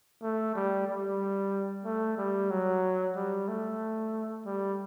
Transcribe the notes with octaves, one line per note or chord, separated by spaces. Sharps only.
A3
G3
G3
A3
G3
F#3
G3
A3
G3